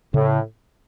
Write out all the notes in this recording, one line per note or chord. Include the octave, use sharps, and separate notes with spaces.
A2 C#3